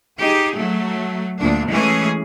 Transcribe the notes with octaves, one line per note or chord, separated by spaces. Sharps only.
D#4 G4 G#4
F#3 A3
D2 A#2 D4
E3 G#3 A3 C#4 G#4